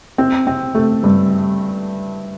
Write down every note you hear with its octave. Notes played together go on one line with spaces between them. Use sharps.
C4
C4
A3
G2